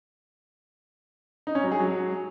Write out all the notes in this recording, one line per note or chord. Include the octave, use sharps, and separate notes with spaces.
D#4
C#4
F#3
G#4
F#3